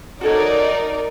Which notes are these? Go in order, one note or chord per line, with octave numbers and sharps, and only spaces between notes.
D#4 F#4 A4 A#4 C#5 D5